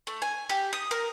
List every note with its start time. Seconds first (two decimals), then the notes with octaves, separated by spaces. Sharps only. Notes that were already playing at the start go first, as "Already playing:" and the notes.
0.07 A3
0.22 G#5
0.49 G4
0.73 D#6
0.91 A#4